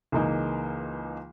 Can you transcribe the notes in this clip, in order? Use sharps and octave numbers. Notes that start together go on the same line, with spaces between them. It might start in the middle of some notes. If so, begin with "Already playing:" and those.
C#2 E3 A#3 D#4 G#4